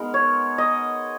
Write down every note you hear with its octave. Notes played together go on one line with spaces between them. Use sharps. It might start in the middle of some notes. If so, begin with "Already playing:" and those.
Already playing: G#3 B3 D#4 A#4
C#5
D#5